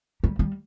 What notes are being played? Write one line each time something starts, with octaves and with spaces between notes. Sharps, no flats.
G3
G3